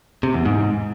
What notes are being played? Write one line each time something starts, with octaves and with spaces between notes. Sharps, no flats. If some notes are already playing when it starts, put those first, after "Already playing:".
C3
E2
G#2